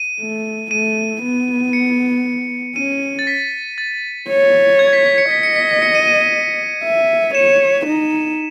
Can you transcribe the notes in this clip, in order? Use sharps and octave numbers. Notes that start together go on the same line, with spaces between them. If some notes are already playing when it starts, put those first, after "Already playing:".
Already playing: D#7
A3
A3 D#7
B3
C#7
C#4 D#7
A6
B6
A6
C#5
G#6
B6
B6
C#7
D#5 B6
C#7
B6
B6
C#7
D#7
D#7
E5
C#5 E7
D#4